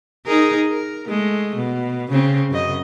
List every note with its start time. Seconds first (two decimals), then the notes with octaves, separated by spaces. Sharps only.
0.26 D#4 G#4 A#4
0.67 A#4
1.08 G#3 A3
1.56 B2
2.11 C#3 C4
2.50 F#2 C#3 D#5